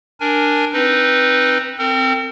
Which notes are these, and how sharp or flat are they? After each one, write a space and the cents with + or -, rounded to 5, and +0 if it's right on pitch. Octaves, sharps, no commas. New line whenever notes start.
D4 +5 A#4 +0 G#5 +0
C4 +15 D#4 +0 B4 -10
C4 +0 A#4 -45